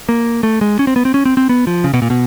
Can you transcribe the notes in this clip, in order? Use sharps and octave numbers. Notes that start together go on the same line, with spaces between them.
A#3
A3
G#3
C#4
C4
B3
C4
C#4
C4
C4
B3
F3
C#3
B2
A#2
B2